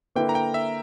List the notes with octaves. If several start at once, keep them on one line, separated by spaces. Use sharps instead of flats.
D3 A#3 E4 B4 G5
A#5
G5
E5